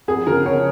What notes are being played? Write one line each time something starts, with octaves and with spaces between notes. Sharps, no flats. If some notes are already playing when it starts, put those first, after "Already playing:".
F2 G#4
C#3 A#4
F2 C#5